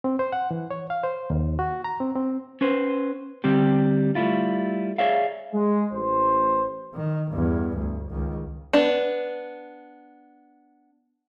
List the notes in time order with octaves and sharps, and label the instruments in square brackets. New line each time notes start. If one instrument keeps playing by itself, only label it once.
[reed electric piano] C4
C5
F#5
E3
C#5
F5
C5
D#2
F#4
A#5
C4
C4
[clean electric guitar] C#4 B4 C5
D3 G3 C4 G4
G3 A3 E4 F4
G#4 C#5 D5 E5 F5
[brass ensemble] G#3
A1 C5
[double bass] D#3
E2 G2
D2
C#2 D#3
[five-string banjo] B3 D4